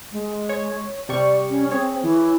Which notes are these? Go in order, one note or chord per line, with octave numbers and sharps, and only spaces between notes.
G#3
C#5
C3 G3 D5 C#6
C#4
C4 G#4 C#5
E3